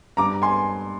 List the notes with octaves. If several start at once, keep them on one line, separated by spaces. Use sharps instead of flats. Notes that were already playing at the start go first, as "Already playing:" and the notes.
G2 A#5 D6
G#5 C6